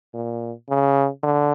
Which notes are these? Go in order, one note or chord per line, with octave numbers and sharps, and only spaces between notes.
A#2
C#3
D3